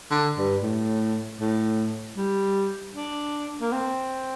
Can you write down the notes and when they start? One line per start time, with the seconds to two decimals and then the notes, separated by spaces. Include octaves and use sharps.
0.11 D3
0.38 G2
0.62 A2
1.40 A2
2.17 G3
2.95 D4
3.61 A#3
3.72 C4